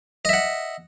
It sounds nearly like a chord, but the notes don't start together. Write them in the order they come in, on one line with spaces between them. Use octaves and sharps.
D#5 E5 F#5